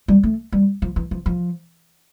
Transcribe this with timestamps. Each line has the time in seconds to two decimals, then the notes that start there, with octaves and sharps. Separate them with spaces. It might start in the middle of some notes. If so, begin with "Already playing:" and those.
0.08 G3
0.23 A3
0.52 G3
0.82 F3
0.96 E3
1.11 F3
1.26 F3